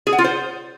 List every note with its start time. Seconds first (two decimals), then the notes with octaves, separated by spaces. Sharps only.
0.07 G#4
0.13 F#5
0.19 F4
0.24 C5